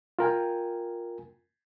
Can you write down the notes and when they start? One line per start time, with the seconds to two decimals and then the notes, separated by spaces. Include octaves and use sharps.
0.19 F4 A#4 G5 G#5